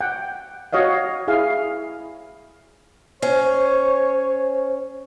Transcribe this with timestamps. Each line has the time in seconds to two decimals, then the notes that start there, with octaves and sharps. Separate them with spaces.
0.01 F#5 G5
0.73 F#4 C#5 D#5 F5
1.28 E4 G#4 F5
3.22 C#4 C5 C#5